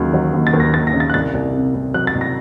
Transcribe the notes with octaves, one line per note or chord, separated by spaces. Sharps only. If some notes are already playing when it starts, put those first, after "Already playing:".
Already playing: D#2 C#3 F#3
F#3
D#2
A6
D#2
A#6
D#2 A6
A#6
C#3
A6
F#6
C2 A6
C2
C3
C2
F#3 F#6
A6
C2
A#6